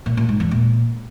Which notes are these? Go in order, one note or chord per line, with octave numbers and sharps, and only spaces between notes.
A#2
A#2
G#2
E2
A#2